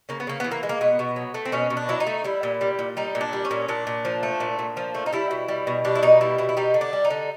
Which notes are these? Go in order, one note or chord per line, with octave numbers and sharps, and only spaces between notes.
C#3 A#3
B3
C#3 A#3
E3 B3
A#3
G#3
A#3
B2 B3
B2
F#3
A3
C4
B2 C#4
B2
D4
F#3 E4
D#4
A3
G3 E4
A#2
G3
A#2
G3 D#4
A#2
D4
G3
C#4
A#2
A#2 D4
A#2
F3
A3
A#2
A#2
F3
A3
D#4
G3 E4
B2
G3
B2
G3 D4
E4
B2 D#4
G3 E4
B2 E4
E4
G3 D#4
D3
D4
G3
D#4
D3